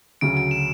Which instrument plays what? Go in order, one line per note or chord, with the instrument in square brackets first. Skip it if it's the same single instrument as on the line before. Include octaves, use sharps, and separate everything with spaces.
[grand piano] D2 C#3 F#3 [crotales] D7
[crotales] D7
E7